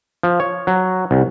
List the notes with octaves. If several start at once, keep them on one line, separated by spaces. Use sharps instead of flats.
F3
C#5
F#3
C2